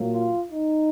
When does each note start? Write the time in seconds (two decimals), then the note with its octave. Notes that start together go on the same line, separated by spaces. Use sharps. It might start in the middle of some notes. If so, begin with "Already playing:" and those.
Already playing: A#2 F#3 A#3
0.12 F4
0.50 D#4